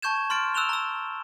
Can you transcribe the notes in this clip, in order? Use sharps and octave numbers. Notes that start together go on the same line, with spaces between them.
A5 C#6 G6 G#6 E7
C6 F6 A6 D7
E6 F#6 E7 F7 G7
A#5 E6